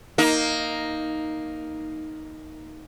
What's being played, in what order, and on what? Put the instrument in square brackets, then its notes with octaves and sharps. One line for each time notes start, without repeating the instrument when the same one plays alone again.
[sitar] A#3 D#4